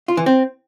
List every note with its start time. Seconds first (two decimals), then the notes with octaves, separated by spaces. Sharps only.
0.08 F4
0.17 E3
0.26 C4